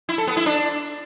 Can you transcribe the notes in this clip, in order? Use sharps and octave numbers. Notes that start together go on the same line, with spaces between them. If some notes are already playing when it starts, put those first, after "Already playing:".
E4
A4
B3
E4
D4